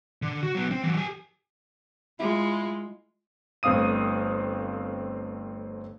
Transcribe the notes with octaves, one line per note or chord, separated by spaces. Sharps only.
D3
F#4
F#3 B3
C4
E3 F#3
G4 G#5
G#3 E4 F4
G1 A3 C4 F5 D#6 D#7